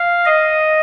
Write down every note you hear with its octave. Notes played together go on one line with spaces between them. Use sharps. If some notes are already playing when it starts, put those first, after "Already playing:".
Already playing: F5
D#5